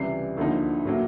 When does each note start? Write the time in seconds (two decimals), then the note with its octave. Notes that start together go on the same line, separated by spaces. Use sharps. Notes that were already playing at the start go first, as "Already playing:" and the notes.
Already playing: C#2 C3 E3 G3 C7
0.37 D2 D3 F3 A#3 D#4
0.85 A2 F#3 A#3